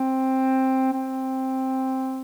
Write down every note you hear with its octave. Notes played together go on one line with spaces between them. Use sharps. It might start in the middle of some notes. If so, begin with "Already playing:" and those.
Already playing: C4
C4